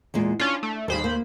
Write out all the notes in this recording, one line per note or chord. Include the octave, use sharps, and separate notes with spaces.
E2 A#2 G#3
C#4 D4 F4
A3
D#2 G3 E4 G#4 C5 B5
A#3